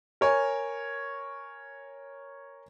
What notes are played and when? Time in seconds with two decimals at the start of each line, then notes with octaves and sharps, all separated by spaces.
0.21 A#4 C#5 G#5